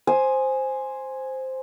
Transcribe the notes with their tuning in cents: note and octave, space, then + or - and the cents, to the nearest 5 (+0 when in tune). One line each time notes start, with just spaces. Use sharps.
C5 +0 G#5 +0 D#6 +0